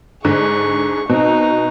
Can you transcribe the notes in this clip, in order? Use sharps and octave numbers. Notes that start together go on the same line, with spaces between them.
G#2 D3 G#4 C#6
B2 C4 D#4